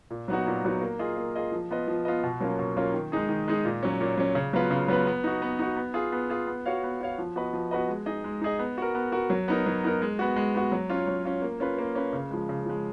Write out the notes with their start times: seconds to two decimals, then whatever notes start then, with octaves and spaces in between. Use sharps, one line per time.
0.11 A#2
0.28 F#3 B3 D#4 F#4
0.47 A#2
0.65 F#3 B3 D#4 F#4
0.81 A#3
0.99 F4 G#4 D#5
1.17 A#3
1.35 F4 G#4 D#5
1.52 F3
1.71 B3 F4 B4 D#5
1.88 F3
2.05 B3 F4 B4 D#5
2.23 B2
2.40 F#3 A#3 C#4 F4
2.59 B2
2.77 F#3 A#3 C#4 F4
2.94 D#3
3.12 G#3 D#4 G#4
3.29 D#3
3.48 G#3 D#4 G#4
3.65 A#2
3.83 F#3 C#4
4.01 A#2
4.17 F#3 C#4
4.35 C#3
4.53 F#3 B3 F4 B4
4.71 C#3
4.88 F#3 B3 F4 B4
5.07 B3
5.24 D#4 F#4
5.42 B3
5.59 D#4 F#4
5.77 B3
5.94 F4 G#4
6.12 B3
6.30 F4 G#4
6.47 B3
6.66 F#4 C#5 F5
6.83 B3
7.01 F#4 C#5 F5
7.18 F3
7.36 B3 F#4 B4 D#5
7.53 F3
7.71 B3 F#4 B4 D#5
7.88 G#3
8.06 D#4 G#4 D#5
8.24 G#3
8.41 D#4 G#4 D#5
8.59 B3
8.78 F#4 A#4
8.95 B3
9.12 F#4 A#4
9.30 F#3
9.48 B3 D#4 A#4
9.66 F#3
9.84 B3 D#4 A#4
10.02 G#3
10.19 B3 F#4
10.36 G#3
10.55 B3 F#4
10.72 F#3
10.90 C#4 F4
11.07 F#3
11.25 C#4 F4
11.42 A#3
11.60 C#4 F4 B4
11.78 A#3
11.95 C#4 F4 B4
12.13 C#3
12.31 F3 G#3
12.49 C#3
12.66 F3 G#3